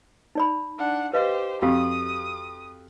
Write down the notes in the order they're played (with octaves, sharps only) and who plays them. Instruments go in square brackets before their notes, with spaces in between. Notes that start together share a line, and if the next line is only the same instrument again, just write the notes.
[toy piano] D#4 D5 B5
[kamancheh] D4 F#5
[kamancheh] G4 C5 [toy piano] B4 D#5 F5
[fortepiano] F2 [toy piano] F#4 G4 F5 [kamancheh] D#6